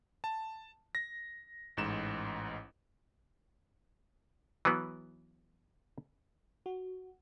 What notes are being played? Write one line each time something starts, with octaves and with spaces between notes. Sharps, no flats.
A5
A#6
A1 G#2 E7
E3 F#3 B3
F#4